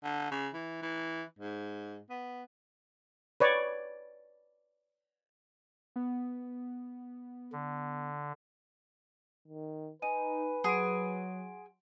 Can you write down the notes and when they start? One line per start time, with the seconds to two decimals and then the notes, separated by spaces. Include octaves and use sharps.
0.03 D3
0.31 C#3
0.53 E3
0.82 E3
1.39 G#2
2.10 B3
3.40 B4 C#5 D5
5.96 B3
7.52 D3
9.48 D#3
10.02 D#4 B4 G#5 D#7
10.64 F#3 G#4 F#5 C6 D7